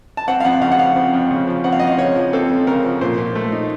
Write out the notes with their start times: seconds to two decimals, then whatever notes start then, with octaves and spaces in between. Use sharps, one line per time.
0.17 A5
0.28 C4 F#5
0.40 F5
0.45 F2 F#5
0.62 C#3 F5
0.72 F#5
0.79 F3 F5
0.96 C4
1.14 F2
1.31 C#3
1.47 F3
1.64 C4 F#5
1.72 F5
1.79 F2 D#5
1.87 F5
1.98 C#3 C#5
2.15 F3
2.33 C4 A4
2.50 F2
2.67 C#3 A#4
2.84 F3
3.01 A#2 C5
3.18 A#2
3.35 A3
3.52 D#4